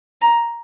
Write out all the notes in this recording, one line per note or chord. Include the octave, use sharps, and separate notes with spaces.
A#5